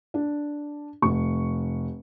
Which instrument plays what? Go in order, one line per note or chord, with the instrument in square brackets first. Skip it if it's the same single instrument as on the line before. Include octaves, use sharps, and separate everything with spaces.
[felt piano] D4
F1 C#6